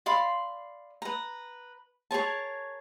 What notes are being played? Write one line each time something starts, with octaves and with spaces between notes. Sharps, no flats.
D5 F5 B5 C6
B4 A#5
G#4 A#4 C#5 A5